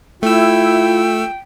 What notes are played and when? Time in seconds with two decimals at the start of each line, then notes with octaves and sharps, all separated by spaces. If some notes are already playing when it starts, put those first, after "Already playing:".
0.23 A3 E4 F4 G5 E6